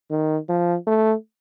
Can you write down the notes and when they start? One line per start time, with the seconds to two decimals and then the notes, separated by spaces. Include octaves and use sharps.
0.11 D#3
0.49 F3
0.87 A3